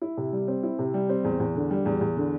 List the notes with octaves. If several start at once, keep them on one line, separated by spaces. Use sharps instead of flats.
E4
C3
G3
C4
E4
C3
G3
C4
E2
E2
D3
G3
E2
E2
D3